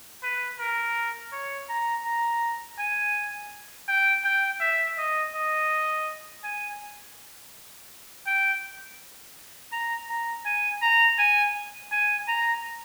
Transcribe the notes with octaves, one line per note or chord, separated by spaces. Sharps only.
B4
A#4
C#5
A#5
A#5
G#5
G5
G5
E5
D#5
D#5
G#5
G5
A#5
A#5
G#5
A#5
G#5
G#5
A#5